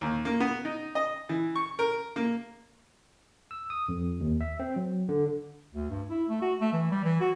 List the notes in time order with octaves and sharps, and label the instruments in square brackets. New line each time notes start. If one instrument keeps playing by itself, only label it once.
[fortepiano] D#2
A#3
B3
D#4
D#5
E3
C#6
A#4
A#3
[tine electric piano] E6
D#6
F2
D#2
E5
C4
F#3
D3
[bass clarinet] D2
G2
E4
A3
F#4
A3
E3
G3
E3
F#4